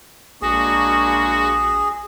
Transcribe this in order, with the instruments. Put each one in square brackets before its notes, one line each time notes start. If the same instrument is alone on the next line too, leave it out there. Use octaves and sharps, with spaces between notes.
[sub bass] A#1 [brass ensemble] G#3 A#3 D4 [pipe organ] F#4 [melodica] G#4